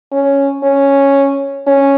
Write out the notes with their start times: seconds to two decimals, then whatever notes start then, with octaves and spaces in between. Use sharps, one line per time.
0.12 C#4
0.63 C#4
1.67 C#4